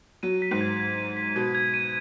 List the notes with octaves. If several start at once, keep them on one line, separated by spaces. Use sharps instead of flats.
F#3 D#7
B6
G#2
G#6
G#6
D#7
B6
B2 G#6
G#6
D#7